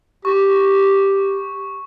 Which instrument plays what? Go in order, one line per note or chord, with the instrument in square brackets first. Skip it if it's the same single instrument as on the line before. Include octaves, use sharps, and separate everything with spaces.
[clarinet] G4 [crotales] C#6